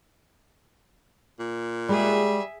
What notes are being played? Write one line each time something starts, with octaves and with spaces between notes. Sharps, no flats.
A#2
G3 G#3 G#4 E5